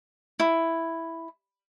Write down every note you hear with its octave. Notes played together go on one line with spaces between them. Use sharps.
E4